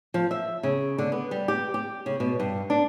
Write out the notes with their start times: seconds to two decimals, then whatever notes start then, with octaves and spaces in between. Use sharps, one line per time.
0.14 F3
0.31 E5
0.63 C#3
0.98 D3
1.12 B3
1.31 G3
1.48 G4
1.74 G4
2.06 C#3
2.20 B2
2.40 G2
2.70 D4